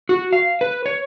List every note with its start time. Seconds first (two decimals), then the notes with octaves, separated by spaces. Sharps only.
0.09 F#4
0.33 F5
0.61 B4
0.86 C#5